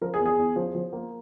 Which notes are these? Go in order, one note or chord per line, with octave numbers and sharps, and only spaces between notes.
F3 A#4
G#4
E2
G#4
E2
F3
F3
A#3